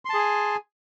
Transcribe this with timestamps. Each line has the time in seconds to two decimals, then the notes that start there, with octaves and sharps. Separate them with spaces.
0.05 C6
0.10 A5
0.14 G#4
0.19 G#5